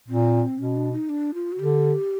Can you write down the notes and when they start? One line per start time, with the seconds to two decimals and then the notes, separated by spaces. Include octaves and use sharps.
0.09 A#2 C4
0.59 B2 C#4
0.76 D4
0.92 D#4
1.09 D4
1.34 F4
1.52 F#4
1.59 D3 G4